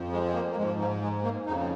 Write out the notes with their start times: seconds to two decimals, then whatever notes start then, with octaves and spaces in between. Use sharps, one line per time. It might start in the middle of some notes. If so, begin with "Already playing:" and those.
Already playing: F2 F3
0.12 G#3
0.29 G#3
0.34 A#3
0.51 A#3
0.56 G#2 F3 G#3
0.79 F3
1.02 G#3
1.23 A#3
1.46 F2 C#3 F3 D#4
1.58 F3